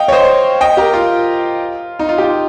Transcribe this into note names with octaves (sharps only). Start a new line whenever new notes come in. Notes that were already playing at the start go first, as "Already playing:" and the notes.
Already playing: D#5 F5 G5
C#5
C5 D#5
D#5 G5
G4 A#4
F4
D#4
F4
G4
F4